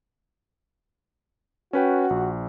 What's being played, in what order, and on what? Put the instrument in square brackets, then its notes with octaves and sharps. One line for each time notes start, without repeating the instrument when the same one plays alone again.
[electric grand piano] C#4 B4 G5 [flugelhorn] F#4
[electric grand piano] A#1